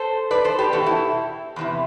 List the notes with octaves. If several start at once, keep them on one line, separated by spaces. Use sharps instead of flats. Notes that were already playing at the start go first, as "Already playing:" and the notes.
Already playing: A4 C5
B4 D5
A4 C5
G4 B4
E2 B2 F#4 A4
E4 G4
E2 C3 E3